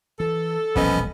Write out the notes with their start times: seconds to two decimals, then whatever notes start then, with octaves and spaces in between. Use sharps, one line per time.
0.20 E3 A4
0.76 E1 A#1 F3 G3 B3 C#4 D#5